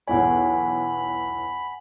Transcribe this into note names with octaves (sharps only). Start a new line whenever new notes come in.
B1 E2 C#5 F#5 G#5 B5